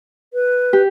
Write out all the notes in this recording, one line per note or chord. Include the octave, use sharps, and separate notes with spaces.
B4
G4